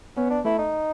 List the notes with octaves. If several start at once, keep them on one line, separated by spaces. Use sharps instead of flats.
B3 C#4
D4
A3 E4
D#4